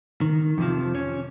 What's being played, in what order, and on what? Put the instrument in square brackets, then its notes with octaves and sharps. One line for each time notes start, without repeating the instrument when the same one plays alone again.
[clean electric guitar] D#3
F2 C3 F3
C#4